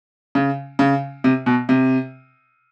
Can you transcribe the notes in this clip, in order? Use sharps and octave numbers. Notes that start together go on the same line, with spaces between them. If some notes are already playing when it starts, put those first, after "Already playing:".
C#3
C#3
C3
B2
C3